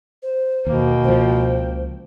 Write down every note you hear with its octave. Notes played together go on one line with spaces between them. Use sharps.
C5
D#2 B2 A#3 G5
C#2 F3 C5